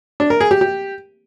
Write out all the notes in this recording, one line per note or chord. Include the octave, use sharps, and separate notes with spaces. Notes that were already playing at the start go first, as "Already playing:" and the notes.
D4
A#4
G#4
G4
G4